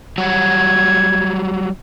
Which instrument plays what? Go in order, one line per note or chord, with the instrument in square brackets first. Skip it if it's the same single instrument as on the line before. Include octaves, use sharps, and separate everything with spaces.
[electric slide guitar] F#3 G3 F#4 [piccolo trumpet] G#6